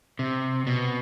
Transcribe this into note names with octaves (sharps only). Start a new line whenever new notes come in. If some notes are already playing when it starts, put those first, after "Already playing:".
C3
B2